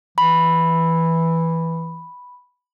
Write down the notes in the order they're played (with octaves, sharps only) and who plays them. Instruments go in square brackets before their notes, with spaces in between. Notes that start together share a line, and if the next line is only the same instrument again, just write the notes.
[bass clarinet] E3 [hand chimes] B5